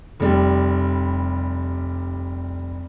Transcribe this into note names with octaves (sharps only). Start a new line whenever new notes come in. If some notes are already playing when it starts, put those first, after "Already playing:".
F1 G3